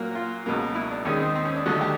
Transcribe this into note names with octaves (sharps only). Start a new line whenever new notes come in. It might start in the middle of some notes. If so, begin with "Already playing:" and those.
Already playing: A#2 F#3 A#3
F4
C#2 B2 F#3 A#3
E4
D4
D#2 D#3 G#3 C#4
C4
C4
C#4
D4
D#2 D3 F#3 A3 F#4
G4